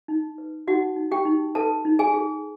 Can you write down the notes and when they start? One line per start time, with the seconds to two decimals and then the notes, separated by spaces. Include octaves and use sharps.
0.08 D#4
0.38 B4
0.67 D#4 F#4 F#5
0.97 D#4
1.11 G4 G5
1.25 D#4
1.55 A4 B4 A5
1.85 D#4
1.99 G#4 G#5
2.14 G#4